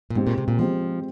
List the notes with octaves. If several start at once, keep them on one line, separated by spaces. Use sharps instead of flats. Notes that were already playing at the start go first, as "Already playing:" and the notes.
A#2
G#2 G#3 C4 G4
A#2
C3
A#2
F3 G#3 C4 G4